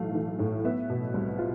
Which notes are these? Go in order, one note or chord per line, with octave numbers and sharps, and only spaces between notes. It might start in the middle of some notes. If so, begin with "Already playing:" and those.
Already playing: B1 A2 E3 A3 F5 A5
E3
A2
B3 E5
B2
C2
F4